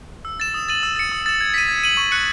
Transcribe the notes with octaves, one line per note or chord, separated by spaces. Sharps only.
E6
A6 E7
D#6
A6 D#7 F#7
E6
A6 C#7
D#6
A6 E7
G#6
B6 D#7
G#6
D#7 F#7
C#6
F#6 C#7 F#7